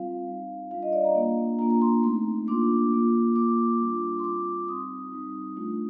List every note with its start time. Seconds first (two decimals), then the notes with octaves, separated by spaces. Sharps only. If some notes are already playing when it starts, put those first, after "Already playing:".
Already playing: G3 C4 F4 F5
0.27 G3 C4 D#4
0.71 G3 D4 F4 F5
0.83 D#5
0.93 D5
1.05 A#5
1.15 A#3 D4 F4
1.59 A#3 D4 F4 A#5
1.70 A#5
1.82 C6
2.03 A3 C4 D#4 C6
2.48 A#3 D4 F4 D6
2.92 A#3 F4
3.36 A#3 F4 D6
3.80 G3 D4 F4
4.19 C6
4.24 G3 C4 F4 D6
4.68 G3 C4 D#4 D#6
5.12 G3 C4 D#4
5.57 A3 D4 F4